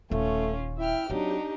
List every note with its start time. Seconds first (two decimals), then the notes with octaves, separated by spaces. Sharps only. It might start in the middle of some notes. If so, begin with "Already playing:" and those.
0.11 D#1 A3 C#4 F4
0.78 E4 E5 G5 F6
1.10 F#3 C4 D4 D#4 G4